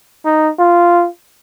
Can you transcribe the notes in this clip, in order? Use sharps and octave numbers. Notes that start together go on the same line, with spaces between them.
D#4
F4